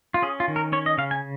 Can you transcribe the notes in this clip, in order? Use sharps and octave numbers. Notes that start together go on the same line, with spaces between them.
F4
C#4 G#4
F4
D#3
A#4
C#4 C#5
D#5
C#3 F5
G#5